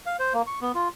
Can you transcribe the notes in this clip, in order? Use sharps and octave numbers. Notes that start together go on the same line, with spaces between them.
F5
C5
A#3
C#6
B3
F4